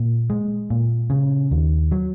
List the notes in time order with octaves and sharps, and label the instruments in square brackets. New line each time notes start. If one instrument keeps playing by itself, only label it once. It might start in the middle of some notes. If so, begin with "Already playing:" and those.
Already playing: [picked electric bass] A#2
G#3
A#2
C#3
D#2
F#3